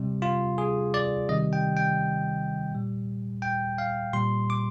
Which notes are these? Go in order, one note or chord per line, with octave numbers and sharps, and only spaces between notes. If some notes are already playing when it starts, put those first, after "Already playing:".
Already playing: C3 G3
F4
G#4
D5
C3 D#3 G3 D#5
G5
G5
A#2 G3
G5
F5
A#2 G3 C6
D6